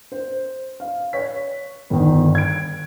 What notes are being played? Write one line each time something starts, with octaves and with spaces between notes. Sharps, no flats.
C5
F5
C#5 B6
G1 D#3
G#6 D7